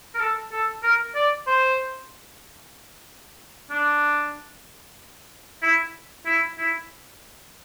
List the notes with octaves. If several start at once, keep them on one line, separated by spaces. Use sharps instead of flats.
A#4
A4
A4
A#4
D5
C5
D4
E4
E4
E4